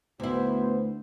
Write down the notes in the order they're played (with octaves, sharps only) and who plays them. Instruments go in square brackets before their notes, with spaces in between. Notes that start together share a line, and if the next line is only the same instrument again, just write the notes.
[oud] D2 E4 [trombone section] B3 F#4 C5